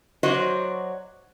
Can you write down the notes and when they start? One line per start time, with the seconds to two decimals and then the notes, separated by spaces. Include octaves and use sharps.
0.23 F#3 F#4 C5 D5 D#5